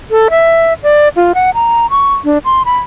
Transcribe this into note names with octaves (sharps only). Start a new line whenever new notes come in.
A4
E5
D5
F4
F#5
A#5
C#6
D4
C6
B5